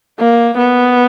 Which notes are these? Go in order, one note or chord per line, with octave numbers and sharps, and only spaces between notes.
A#3
B3